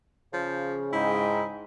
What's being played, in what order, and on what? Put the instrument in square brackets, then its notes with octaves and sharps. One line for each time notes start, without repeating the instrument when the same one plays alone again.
[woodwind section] C#3 [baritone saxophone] F3
[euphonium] G#2 [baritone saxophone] E4 [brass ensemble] D#5 G5